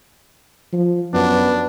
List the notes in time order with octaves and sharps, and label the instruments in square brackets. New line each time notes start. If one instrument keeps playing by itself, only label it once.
[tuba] F3
[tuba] F#2 [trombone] B3 [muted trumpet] D4